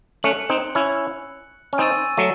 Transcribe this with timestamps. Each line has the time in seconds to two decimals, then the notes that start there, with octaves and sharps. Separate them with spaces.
0.23 A3 C#4 F#6 C#7 F#7
0.49 C4 D#4
0.75 C#4 E4
1.73 C#4
1.78 C4 D#4 G#5 C#6 E6 A6 D#7
2.17 F#3 A3